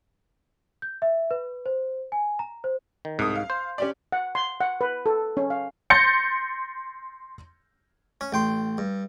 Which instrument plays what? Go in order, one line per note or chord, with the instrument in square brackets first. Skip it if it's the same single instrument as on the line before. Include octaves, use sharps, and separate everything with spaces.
[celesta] G6
E5
B4
C5
G#5
A#5
C5
[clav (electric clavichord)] D#3
[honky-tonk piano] C2 D#6 [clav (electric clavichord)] G#2
[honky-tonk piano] F5
[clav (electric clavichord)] C5
[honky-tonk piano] C#4 G4 D5
[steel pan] F#5
C6
F#5
B4
A4
C#4
F5
[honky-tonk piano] C6 G6 A6 A#6 C#7
[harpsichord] C#4
A1 G5 C6
G2